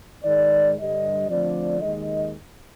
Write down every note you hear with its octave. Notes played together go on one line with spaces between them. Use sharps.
G#2 D#3 G#3 D5
G2 D3 G3 D#5
D3 F3 A3 C4 D5
D#2 D#3 G#3 D#5